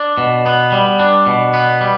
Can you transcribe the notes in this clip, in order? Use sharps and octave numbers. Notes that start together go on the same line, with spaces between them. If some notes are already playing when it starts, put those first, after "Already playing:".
Already playing: D4
B2
B3
G3
D4
B2
B3
G3